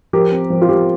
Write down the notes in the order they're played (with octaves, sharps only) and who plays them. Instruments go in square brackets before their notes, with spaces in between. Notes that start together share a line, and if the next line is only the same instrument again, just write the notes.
[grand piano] F3 G4 A#4
C4
F3
F4
F3 G4